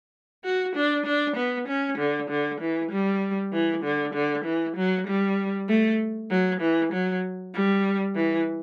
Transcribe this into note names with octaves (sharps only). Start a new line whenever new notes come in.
F#4
D4
D4
B3
C#4
D3
D3
E3
G3
E3
D3
D3
E3
F#3
G3
A3
F#3
E3
F#3
G3
E3